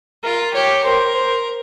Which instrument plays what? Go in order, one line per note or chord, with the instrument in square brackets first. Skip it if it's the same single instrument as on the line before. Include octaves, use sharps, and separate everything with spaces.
[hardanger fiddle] F4 [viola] A#4
[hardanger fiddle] G4 [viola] C#5
[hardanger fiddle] A#4 [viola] C5
[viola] C5